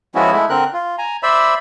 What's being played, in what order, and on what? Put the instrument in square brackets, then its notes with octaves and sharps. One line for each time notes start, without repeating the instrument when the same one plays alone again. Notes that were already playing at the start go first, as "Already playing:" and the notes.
[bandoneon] F3 G#3 B3 C#4 E4 F#4
G#3 A3 E4
D3 C4 A#4 F#6
F4
G#5 A#5
C5 D5 E5 B5 E6